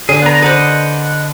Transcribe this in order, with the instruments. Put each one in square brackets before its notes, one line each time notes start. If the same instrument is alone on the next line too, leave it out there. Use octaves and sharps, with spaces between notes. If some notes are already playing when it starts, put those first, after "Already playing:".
[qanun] D3 [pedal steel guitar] G#4
[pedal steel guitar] B3 A#5
[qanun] B4 C5 [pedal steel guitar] D#5 F#5